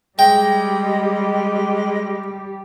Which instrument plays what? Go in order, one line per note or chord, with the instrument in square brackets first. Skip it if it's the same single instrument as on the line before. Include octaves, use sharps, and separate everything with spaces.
[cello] G3 G4 [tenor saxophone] G#3 [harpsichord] G5